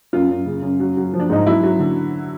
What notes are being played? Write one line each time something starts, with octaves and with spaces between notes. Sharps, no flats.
F#2 F4
F#2
C#3
F#2
F#3
F#3
F3
D4
G#2 D#4
F#3 E4
F#3
D3